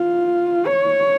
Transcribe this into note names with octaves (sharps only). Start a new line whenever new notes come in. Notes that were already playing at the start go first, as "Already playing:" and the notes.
Already playing: F4
C#5